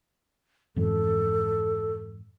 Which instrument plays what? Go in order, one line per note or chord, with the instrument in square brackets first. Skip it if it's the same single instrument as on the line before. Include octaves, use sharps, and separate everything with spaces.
[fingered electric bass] F2 G#2 E3 [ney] A4